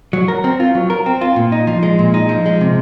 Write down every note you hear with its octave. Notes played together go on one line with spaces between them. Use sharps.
F#3
A#4
C4
F4
F#3
A#4
C4
F4
A#2
D#4
F3
G#3
A#2
D#4
F3
G#3
C3